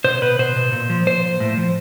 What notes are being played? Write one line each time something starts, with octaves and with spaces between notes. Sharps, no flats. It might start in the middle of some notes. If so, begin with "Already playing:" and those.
B2 C5
B2 B4
B2 C5
B2
A#2
F3
F3 C5
A#2
A2
F3